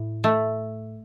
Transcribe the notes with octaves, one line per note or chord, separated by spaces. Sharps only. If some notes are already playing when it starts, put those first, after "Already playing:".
Already playing: A2
A3